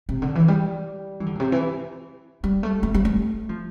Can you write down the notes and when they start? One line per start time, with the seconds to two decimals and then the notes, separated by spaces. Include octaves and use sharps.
0.09 C3
0.22 D3
0.35 E3
0.48 G3
1.20 E3
1.26 D3
1.35 A#2
1.40 C3
1.52 E3
2.44 G3
2.63 A3
2.83 A3
2.94 G3
3.05 A3
3.49 F3